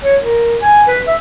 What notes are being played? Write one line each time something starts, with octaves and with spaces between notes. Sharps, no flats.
C#5
A#4
G#5
B4
E5